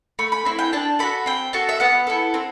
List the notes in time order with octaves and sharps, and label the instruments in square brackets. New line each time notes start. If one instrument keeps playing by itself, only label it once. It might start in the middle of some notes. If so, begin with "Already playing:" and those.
[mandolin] A3 B5
B5
C4 E4
G5
D4 A5
F#4 A4 B5
C4 G5
F#4 A4 A5
E5
B3 F#5
E4 A4
C4